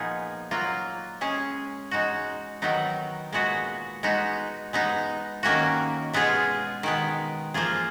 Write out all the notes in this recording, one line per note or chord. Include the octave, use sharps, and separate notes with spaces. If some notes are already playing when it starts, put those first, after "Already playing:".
Already playing: A#2 F3 B3 D#4 G#4
F#3 A#3 F4
G#3 C#4 G#4
G#3 D#4 F#4
D#3 F#3 B3 D#4
A#2 G#3 B3 F#4
G#3 B3 D#4 F#4
G#3 B3 D#4
D#3 A#3 C#4 F#4
B2 G#3 B3 F4 G#4
D#3 G#3 B3
F3 A#3 F4 G#4